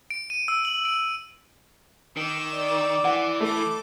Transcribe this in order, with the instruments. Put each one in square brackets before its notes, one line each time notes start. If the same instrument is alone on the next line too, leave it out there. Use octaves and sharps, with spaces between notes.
[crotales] D7
D#7
E6
F#7
D7
[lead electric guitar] D#3 [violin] D6 E6
[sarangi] D5
[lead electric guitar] E3 [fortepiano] F#5
[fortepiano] A3 [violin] A4 D6